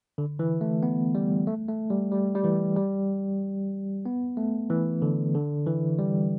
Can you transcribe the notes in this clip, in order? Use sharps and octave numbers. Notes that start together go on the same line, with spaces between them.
D3
E3
A3
B3
G3
A3
A3
G3
G3
G3
E3
G3
B3
A3
E3
D3
D3
E3
G3